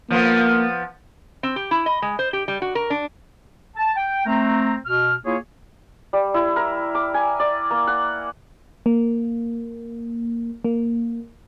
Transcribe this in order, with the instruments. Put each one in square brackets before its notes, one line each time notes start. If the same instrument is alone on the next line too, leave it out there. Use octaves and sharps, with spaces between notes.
[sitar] F3 B3 [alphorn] A#3
[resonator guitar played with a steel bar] C4
G4
E4
D#5
G#3
C5
G4
G3
F#4
A#4
D4
[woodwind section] A5
G5
A3 C4 A#5
B2 F6
A#3 E4 F4 G#4 C#5
[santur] G3
E4
A#4
D6
G#5
D5
A#3
F#5
[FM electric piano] A#3
A#3